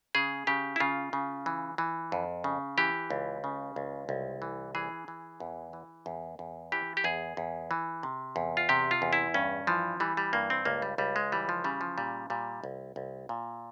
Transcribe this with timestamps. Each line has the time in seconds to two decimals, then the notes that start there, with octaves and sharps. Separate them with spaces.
0.15 C#3 G#4
0.47 C#3 G4
0.76 E4
0.80 C#3 F4
1.13 C#3
1.46 E3
1.78 E3
2.12 F2
2.44 C#3
2.78 E3 G4
3.11 C#2
3.44 C#3
3.76 C#2
4.09 C2
4.42 E3
4.75 E3 G#4
5.08 E3
5.40 E2
5.73 E3
6.06 E2
6.39 E2
6.72 E3 G4
6.97 G4
7.04 E2 G#4
7.37 E2
7.71 E3
8.03 C3
8.36 E2
8.57 F4
8.69 C3 G4
8.91 F4
9.02 E2
9.13 E4
9.34 G2 C#4
9.67 E3 F3
10.00 E3 G3
10.17 G3
10.33 G2 A#3
10.50 C4
10.65 C#2 A#3
10.82 G3
10.98 C#2 G3
11.16 G#3
11.32 E3 G3
11.49 F3
11.64 C#3 G3
11.81 F3
11.98 A#2 G3
12.30 A#2 G3
12.64 C2
12.96 C2
13.29 A#2